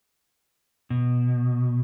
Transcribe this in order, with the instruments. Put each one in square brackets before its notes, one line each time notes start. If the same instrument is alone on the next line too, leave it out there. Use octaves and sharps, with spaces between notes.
[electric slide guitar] B2